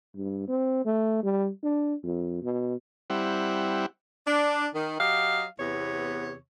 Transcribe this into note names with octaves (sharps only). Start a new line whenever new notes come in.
G2
C4
A3
G3
D4
F2
B2
G3 C4 E4 F#5
D4
D#3
F#3 G4 D#5 F5
E2 C3 B3 C#5